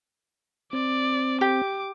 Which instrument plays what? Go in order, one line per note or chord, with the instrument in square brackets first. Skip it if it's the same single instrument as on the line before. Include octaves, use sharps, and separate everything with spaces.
[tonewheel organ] C4 [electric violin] D5
[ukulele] G4 [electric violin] D6